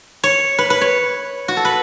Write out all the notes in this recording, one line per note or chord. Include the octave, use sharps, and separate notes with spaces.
C#5
B4
B4
C#5
F#4
A4
B4